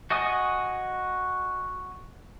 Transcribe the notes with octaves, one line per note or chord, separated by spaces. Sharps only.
F#4 D#5 G#5 D#6